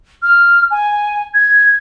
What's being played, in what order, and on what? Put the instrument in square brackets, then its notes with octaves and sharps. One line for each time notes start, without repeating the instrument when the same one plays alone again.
[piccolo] F6
G#5
G#6